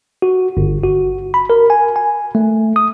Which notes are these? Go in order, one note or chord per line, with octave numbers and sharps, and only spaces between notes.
F#4
G1
F#4
B5
A#4
G#5
G#5
A3
D#6